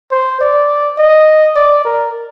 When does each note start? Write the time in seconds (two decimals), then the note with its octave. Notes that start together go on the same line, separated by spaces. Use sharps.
0.11 C5
0.41 D5
0.98 D#5
1.56 D5
1.84 A#4